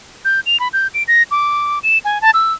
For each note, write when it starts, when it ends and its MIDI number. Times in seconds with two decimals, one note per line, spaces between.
0.25 0.40 91
0.46 0.59 101
0.60 0.68 83
0.73 0.88 91
0.94 1.03 98
1.08 1.23 94
1.31 1.79 86
1.83 1.98 100
2.05 2.21 80
2.22 2.31 81
2.34 2.53 88